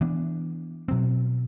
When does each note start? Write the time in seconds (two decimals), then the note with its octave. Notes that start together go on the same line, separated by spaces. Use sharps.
0.01 E3 B3 D4
0.88 B2 F#3 C4